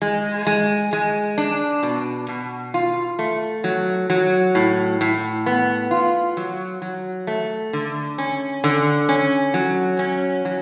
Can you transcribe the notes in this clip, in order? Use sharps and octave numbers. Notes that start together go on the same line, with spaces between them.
G#3
G#3
G#3
D4
B2
B2
F4
A3
F#3
F#3
A2
A2
B3
F4
F#3
F#3
A3
D3
C#4
D3
C#4
F#3
C#4
F#3